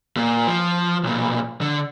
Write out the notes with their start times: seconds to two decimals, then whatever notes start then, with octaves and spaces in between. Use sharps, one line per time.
0.17 A#2 A#3
0.47 F3
1.03 B1 A#2
1.61 D3